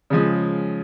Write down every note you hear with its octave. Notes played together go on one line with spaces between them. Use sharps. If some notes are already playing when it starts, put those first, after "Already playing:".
C#3 F3 G#3